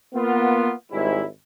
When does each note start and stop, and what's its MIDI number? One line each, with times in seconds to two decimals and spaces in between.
0.14 0.73 58
0.14 0.73 59
0.14 0.73 65
0.92 1.24 32
0.92 1.24 44
0.92 1.24 55
0.92 1.24 64